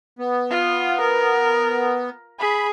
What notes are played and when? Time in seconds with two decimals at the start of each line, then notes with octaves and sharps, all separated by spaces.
0.18 B3
0.50 F4
1.01 A#4
2.40 G#4 B5